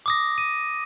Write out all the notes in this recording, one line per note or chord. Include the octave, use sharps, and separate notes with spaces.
D6 D#6 A#6
D#7